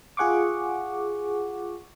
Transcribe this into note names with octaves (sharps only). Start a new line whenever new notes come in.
F4 G#4 F#5 C#6 D6